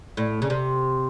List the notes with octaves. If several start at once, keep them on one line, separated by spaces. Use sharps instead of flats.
A2
C#3
C3